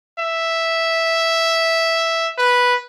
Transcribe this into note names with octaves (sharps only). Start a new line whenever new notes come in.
E5
B4